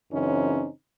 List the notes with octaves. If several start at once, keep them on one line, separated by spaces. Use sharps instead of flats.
F#2 C#3 E3 C4 C#4 D#4